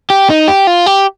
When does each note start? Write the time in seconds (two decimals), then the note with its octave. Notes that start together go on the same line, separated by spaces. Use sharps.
0.10 G4
0.30 D#4
0.48 G4
0.67 F4
0.86 G4